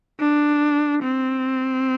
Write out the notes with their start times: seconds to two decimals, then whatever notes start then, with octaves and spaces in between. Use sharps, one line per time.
0.20 D4
1.03 C4